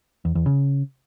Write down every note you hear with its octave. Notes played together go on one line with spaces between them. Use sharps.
E2
E2
C#3